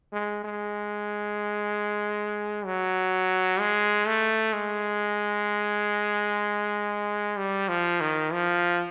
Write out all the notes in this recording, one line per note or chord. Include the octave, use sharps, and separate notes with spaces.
G#3
G#3
F#3
G#3
A3
G#3
G3
F3
D#3
F3